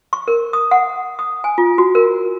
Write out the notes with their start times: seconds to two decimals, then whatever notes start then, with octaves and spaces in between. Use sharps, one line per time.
0.13 C#6
0.28 A#4
0.53 D#6
0.71 F#5
1.19 D#6
1.44 G#5
1.58 F4
1.78 F#4
1.95 A#4